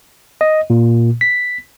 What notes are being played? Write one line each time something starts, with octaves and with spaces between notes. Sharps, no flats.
D#5
A#2
B6